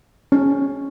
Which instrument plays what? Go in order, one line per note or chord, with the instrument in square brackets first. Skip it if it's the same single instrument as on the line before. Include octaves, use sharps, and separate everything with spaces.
[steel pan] C#4